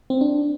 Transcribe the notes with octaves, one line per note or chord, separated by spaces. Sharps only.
C4
D4